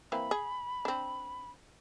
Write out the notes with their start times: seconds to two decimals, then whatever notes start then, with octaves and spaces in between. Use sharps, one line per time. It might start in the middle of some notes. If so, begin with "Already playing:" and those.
0.12 E3 A#3 C4 B5
0.31 G#4
0.85 C4 D4